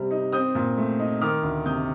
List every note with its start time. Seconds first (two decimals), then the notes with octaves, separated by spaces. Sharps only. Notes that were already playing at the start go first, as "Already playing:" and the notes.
Already playing: C3 G3 C4
0.11 D#4
0.33 C4 D#6 G6
0.55 A#2
0.77 A3
0.99 D#4
1.21 D#3 D6 F6
1.43 D2
1.65 C3 D#6 G6